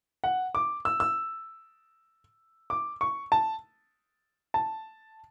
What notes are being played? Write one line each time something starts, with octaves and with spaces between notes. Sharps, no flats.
F#5
D6
E6
E6
D6
C#6
A5
A5